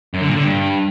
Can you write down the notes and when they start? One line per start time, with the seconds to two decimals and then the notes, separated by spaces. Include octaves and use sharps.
0.14 F#2
0.21 D3
0.28 A#2
0.35 D3
0.43 G2